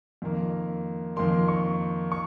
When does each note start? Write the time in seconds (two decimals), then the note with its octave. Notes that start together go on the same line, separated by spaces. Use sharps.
0.22 F2 D#3 A#3
1.16 F2 D#3 A#3 C6
1.48 C#6
2.12 C#6